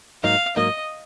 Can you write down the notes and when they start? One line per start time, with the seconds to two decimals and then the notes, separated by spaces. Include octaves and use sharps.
0.24 G#2 F#3 A#3 D#4 F5
0.56 G#2 F#3 A#3 D#4 D#5